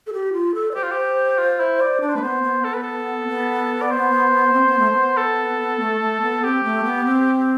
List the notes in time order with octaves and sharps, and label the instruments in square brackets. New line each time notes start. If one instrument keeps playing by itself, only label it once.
[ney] A4
G4
F4
A4
D5
[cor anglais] G4 [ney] C5
[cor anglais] F4
G4
F4
E4
D5
[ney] D4 [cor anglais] D5
[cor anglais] C5
[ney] A3 [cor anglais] B4
[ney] B3 [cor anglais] C5
[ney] B3
[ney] B3 [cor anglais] A4
[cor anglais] B4
A4
[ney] B3
[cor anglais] D5
C5
[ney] C4
B3
A3
B3
[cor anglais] A4
[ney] A3
A3
B3
[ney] C4 [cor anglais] G4
[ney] A3
B3
C4